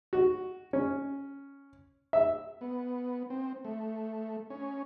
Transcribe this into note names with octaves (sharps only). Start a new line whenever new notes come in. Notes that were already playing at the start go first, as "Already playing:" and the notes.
F#4
C#4
E5
B3
C4
A3
C#4